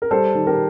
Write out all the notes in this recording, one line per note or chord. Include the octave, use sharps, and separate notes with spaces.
A#4
G3 A4 C5
D#3
G4 A#4